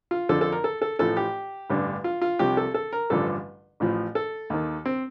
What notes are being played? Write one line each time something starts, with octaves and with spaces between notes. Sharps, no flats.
F4
F2 D3 F3 A4
A4
A#4
A4
A4
A1 A2 F3 A4
G4
A1 G2 D3
F4
F4
C2 C3 F3 G4
A4
A4
A#4
A1 G2 D3 F3 A4
A1 A2 F3
A4
D#2 D#3
C4